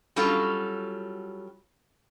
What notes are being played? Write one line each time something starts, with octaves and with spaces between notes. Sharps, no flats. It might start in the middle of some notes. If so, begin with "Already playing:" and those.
F#3 G3 C#4 F4 F#4 A4